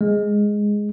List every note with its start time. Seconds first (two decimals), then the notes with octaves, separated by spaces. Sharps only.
0.01 G#3